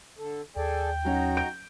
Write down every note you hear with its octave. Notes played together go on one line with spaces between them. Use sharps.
D3 A4
D#2 G#4 A4 D5 G5
F#3 C#4 D#4 F#4 A#5
G6 D7